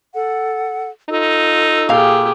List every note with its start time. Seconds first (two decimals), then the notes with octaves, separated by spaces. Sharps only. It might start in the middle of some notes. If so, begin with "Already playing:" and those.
0.13 A4 F#5
1.09 D#4 F4 A4 E6
1.89 A#2 G4 G#4 F5